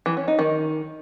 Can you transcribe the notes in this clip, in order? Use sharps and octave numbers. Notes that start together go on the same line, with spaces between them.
E3
C#4
D#4
D#3